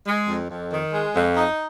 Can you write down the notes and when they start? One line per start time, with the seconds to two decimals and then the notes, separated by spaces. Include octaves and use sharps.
0.07 G#3
0.28 F2
0.50 F2
0.71 D#3
0.93 G#3
1.14 F2
1.36 D#4